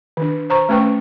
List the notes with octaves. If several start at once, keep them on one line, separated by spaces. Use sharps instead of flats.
D#3 D4
C5 A#5 C#6
A3 C#4 B4 G5 C#6